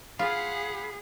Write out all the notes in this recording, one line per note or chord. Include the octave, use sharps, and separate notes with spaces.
F4 G#4 F5 F#5 B5